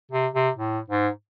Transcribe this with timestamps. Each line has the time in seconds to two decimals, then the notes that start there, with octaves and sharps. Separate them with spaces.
0.11 C3
0.34 C3
0.56 A2
0.90 G#2